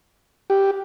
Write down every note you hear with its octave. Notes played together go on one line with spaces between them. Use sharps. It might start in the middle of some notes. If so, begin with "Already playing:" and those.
G4